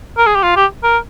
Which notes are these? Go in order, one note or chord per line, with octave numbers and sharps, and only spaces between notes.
A#4
G#4
G4
F4
G4
A#4